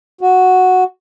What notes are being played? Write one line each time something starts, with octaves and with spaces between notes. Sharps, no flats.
F#4